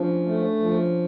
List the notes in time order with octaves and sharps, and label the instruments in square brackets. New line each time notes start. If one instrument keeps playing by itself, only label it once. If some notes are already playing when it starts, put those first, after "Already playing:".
Already playing: [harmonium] F3 [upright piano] C#4 D4
[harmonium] A3
F3